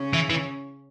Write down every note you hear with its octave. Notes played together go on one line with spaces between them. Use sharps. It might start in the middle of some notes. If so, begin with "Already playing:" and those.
Already playing: C#3 C#4
E3
E3